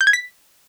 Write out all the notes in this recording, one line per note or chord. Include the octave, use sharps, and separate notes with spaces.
G6
G#6
B6